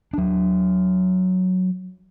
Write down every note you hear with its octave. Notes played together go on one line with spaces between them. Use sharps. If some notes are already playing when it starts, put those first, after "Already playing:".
F#3 D4